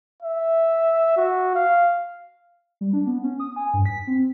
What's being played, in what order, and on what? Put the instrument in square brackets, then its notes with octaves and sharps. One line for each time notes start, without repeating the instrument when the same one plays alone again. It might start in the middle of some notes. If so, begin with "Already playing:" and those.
[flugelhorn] E5
F#4
F5
[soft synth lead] G3
D4
B3
C#4
D#6
G#5
G2
B6
C4